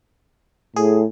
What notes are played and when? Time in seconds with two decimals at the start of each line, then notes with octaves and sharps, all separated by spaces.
0.76 A2 G#4